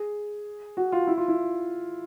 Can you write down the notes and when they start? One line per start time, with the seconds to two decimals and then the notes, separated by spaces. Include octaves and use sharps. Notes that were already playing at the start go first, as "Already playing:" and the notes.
Already playing: G#4
0.77 F#4
0.92 F4
1.07 E4
1.18 F4
1.28 E4